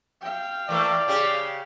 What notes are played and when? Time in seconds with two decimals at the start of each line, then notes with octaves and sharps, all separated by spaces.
0.21 F5 G5
0.69 E3 A3 A#3 D5
1.08 C#3 G4